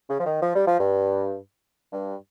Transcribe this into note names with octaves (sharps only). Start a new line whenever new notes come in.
C#3
F3
D#3
F3
G3
F3
G2
G2